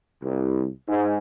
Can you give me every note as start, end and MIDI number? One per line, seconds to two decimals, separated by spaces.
0.22 0.67 36
0.88 1.18 44